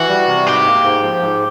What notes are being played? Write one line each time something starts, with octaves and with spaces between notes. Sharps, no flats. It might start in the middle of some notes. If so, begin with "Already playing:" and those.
Already playing: E3 F#4
G3
C3
G#2 G4
A#3
G#2
F3
G#2